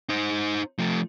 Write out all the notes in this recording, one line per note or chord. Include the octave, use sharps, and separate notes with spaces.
D#4 C5
F3 A3